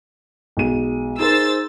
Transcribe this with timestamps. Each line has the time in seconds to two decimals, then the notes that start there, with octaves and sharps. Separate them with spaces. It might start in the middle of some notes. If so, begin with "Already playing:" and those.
0.57 B1 G#3 D#7
1.19 D#4 G#4 A#4 C5 E6 A6